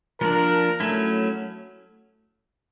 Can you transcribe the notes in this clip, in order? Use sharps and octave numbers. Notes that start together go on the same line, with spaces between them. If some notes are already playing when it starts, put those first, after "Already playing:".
F3 A#3 D4 A#4
F#3 A3 C#4 E4